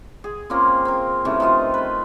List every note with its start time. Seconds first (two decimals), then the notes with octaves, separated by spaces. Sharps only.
0.24 G#4
0.50 A#3 C4 C#4 F4
0.85 C4 A#4
1.25 C3 E3 A3 C#4
1.40 D#3 A3 F4 D#5
1.74 B4 C5